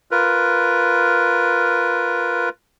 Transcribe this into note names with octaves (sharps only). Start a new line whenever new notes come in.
F4 A#4 B4